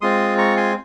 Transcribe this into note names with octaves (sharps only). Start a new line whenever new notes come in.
G#3 C4 F4 C6 D#6
A#5 C#6
G#5 C6